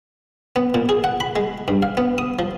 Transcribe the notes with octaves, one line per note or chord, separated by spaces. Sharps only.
B3
A#2
G#4
F#5
B5
G#3
G2
F5
B3
D#6
F3